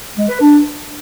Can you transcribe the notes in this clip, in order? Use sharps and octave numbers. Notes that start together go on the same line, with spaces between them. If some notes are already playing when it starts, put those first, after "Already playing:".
G#3
B4
D4